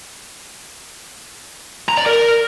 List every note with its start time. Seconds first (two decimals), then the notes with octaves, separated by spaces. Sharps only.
1.89 A#5
1.97 D5
2.06 A#4